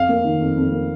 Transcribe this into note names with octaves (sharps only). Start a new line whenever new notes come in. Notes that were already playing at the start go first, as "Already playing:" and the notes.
Already playing: F2 F5
A#3
D#3
F2
F2
A#3